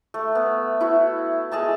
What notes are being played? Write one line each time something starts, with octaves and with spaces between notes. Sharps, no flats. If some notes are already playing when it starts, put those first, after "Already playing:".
A3
B3
E4 F#4
G#3 G#4 A5 A#5